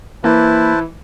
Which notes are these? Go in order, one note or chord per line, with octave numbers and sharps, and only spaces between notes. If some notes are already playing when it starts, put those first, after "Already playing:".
E3 A#3 E4 B4 C5 A5